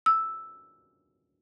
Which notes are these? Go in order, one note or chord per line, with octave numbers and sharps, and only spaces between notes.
E6